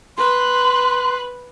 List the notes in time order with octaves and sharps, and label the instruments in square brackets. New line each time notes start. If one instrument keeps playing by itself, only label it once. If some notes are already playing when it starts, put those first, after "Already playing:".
[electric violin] B4 F#6 [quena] C6